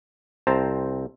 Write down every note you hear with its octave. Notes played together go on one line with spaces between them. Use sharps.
C2 C4 C5 A5 A#5